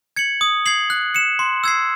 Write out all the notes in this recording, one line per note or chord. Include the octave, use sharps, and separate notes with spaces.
G#6 C#7 F#7
D#6
G#6 C7 F#7
F#6
C#7 E7
C6
E6 G#6 C7